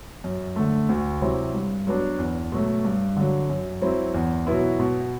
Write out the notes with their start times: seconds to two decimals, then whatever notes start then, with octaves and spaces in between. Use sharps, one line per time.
0.24 F#2
0.56 D3 A3
0.89 D2
1.22 C3 F#3 C4 E4
1.54 G2
1.87 F#3 B3 D4
2.19 E2
2.52 B2 F#3 A3
2.85 G2
3.16 D3 F#3
3.50 F#2
3.82 F#3 C4 E4
4.14 E2
4.47 B2 F#3 B3 E4
4.80 B2